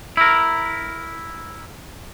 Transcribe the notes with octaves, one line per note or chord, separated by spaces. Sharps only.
E4 A#4